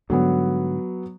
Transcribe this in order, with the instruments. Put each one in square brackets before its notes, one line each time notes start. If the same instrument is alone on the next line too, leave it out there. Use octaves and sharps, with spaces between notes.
[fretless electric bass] G#2 D3 G3 [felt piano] F#3 B3